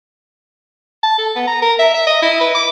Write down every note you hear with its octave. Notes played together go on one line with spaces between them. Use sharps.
A5
A4
B3
A#5
A#4
E5
E5
D#5
E4
B4
D6